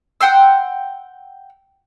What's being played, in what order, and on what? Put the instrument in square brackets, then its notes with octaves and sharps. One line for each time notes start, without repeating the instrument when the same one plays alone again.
[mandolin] F#5 G5 C6 E6